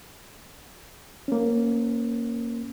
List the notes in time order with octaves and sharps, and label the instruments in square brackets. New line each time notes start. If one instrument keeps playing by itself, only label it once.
[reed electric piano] A#3 C#4